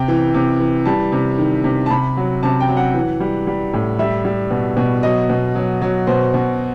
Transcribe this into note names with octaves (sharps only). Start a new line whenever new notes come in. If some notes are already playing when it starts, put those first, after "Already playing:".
Already playing: C3 G5
E3
C3
E3
G3 A5
C3
D#3
C3
A5
C3 B5
F#3
C3 A5
G5
F#3
F#5
E3
G3
G3
A2
G3 E5
G3
B2
B2
F#3 D#5
B2
F#3
F#3
B2 C5
B2